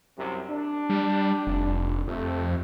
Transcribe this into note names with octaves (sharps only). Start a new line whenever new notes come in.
C2 F#2 C3
D4
G3
F1
F2 C3 A3 C4